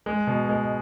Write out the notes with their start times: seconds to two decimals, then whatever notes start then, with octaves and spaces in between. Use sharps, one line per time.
0.06 G#3
0.27 B2
0.49 G#3